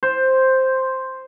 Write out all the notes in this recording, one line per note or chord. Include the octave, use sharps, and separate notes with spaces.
C5